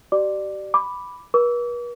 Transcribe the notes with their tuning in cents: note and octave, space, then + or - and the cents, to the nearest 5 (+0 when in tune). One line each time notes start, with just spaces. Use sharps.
G4 -35 D5 +20 D6 +0
B5 +0 D6 +0
B4 -45 D6 -40